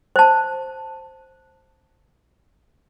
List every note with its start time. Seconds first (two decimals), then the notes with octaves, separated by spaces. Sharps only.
0.16 C5 A5